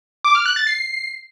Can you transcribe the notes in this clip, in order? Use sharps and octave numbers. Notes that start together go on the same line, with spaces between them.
D6
F6
F#6
A6
C7